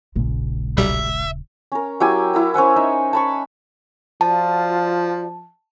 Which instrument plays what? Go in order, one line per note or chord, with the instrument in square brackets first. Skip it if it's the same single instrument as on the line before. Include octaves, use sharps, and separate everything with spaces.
[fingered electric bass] D#1 A#2 C#3 [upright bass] A#1 G#3
[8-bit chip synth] B1 G3 [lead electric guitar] E5
[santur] C#4 A#4
F#3 E4 G4 G#5
E4 A#4 F#5
C#4 C5 F#5 G#5
D#4 E5
A5 B5 C#6
[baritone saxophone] F3 [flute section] F4 F#4 D5 [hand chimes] A5